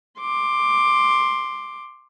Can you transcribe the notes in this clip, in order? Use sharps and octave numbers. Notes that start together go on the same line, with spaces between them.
C6 D6